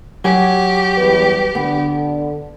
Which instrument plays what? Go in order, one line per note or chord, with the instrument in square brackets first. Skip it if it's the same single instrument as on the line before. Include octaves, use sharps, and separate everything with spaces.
[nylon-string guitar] F#3 G#5 [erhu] G4
[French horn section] E2 G3 B4
[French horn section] D3 [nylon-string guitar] B3